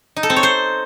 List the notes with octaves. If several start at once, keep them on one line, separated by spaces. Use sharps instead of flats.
D#4
A4
C4
C#5
C5